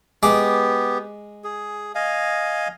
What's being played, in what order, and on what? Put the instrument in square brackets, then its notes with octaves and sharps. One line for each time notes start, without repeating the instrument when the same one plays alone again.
[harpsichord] G#3 D6 [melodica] B3 G4
[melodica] G#4
D#5 F5 G#5